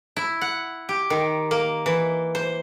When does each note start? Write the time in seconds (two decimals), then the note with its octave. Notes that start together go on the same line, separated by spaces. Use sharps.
0.17 E4
0.41 F#5
0.89 G4
1.10 D#3
1.51 A#3
1.86 E3
2.35 C5